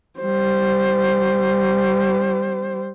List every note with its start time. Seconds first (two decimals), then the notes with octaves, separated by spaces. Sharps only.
0.20 G3 C5